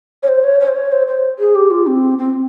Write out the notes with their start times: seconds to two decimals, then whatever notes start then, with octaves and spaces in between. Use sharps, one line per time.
0.23 C#5
0.28 C5
0.44 C#5
0.60 C#5
0.68 C5
0.75 C#5
0.92 C5
1.07 C5
1.39 G#4
1.55 G4
1.71 F4
1.87 C4
2.18 C4